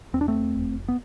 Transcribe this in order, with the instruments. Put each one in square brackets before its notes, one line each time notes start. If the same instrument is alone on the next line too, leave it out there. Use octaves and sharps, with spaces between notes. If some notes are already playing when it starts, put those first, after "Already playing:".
[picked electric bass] E2 C4
D4
A3 C4
F1
B3